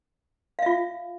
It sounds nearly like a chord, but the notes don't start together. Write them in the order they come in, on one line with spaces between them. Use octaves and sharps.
F5 E5 F4